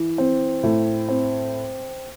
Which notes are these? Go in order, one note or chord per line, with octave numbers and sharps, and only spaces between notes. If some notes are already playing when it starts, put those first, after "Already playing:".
Already playing: E3
C4
A2
C4